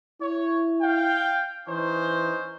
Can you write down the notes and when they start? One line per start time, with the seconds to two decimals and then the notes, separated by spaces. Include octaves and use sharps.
0.21 E4 C#5
0.81 F5 G5
1.68 E3 C#4 D#4 C5